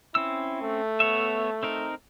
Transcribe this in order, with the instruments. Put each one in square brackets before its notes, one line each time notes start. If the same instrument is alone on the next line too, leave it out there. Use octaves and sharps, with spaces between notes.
[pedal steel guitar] C4 C#4 E6 [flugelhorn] E4
[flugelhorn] A3
[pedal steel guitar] B3 C#5 E5
C4 D#4 A#4